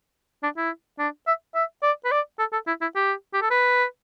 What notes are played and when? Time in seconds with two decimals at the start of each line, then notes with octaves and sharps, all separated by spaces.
0.43 D4
0.57 E4
0.99 D4
1.27 E5
1.55 E5
1.83 D5
2.05 B4
2.12 D5
2.39 A4
2.53 A4
2.67 E4
2.82 E4
2.96 G4
3.33 G4
3.42 A4
3.51 B4